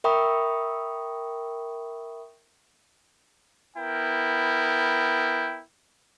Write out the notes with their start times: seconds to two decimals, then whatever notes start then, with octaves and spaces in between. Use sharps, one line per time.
0.04 A#4 E5 G5 B5 C#6 D#6
3.77 B3 E4 A#4 G5